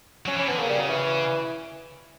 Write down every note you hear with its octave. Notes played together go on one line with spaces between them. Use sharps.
F#3 C#4
E3 C#4
D3 B3
C#3 A#3
G3
F#3
E3